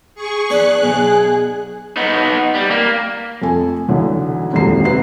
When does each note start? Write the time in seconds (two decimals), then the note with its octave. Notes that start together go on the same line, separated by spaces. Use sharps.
0.15 G#4 C#6
0.50 E2 D4 B4 F#6
0.83 B1 B2 G#4
1.97 B3 D#4
2.55 G3
2.71 A#3
3.42 F2 A3 A4 G#5
3.88 B1 D3 E3
4.53 D#1 G#1 F2 A4 A#5 C7
4.85 C3 B4 F#5 C7